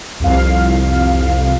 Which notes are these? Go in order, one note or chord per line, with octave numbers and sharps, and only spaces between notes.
C2 F2 F5